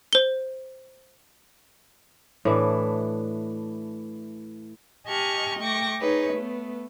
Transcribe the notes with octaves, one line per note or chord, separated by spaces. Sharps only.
C5 G7
A2 E3 D4
G4 D#5 G#5 A5 C#6 F6
A3 G5 C#6 D6 A#6
D#4 G#4 B4 C#5
A3 B3